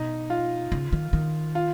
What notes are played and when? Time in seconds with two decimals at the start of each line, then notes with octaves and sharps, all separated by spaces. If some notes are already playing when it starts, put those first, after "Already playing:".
Already playing: B2 D#4
0.30 F4
0.72 C#3
0.92 D#3
1.13 D#3
1.55 F4